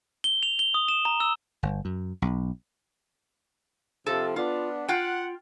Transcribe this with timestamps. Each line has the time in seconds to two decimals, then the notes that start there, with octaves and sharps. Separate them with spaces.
0.24 G7
0.43 F7
0.59 G7
0.74 D#6
0.88 E7
1.05 A#5
1.20 E6
1.63 G1
1.85 F#2
2.22 B1
4.06 C3 F3 A4
4.36 B3 D4 F4
4.88 F4 F#5 G5